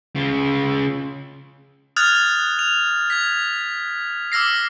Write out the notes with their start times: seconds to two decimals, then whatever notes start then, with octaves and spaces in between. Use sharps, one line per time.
0.16 C#3 F4
1.96 D#6 F6 F#6 G#6 A6 F7
2.59 F7
3.10 G#6 B6
4.32 D6 E6 F6 A#6 C7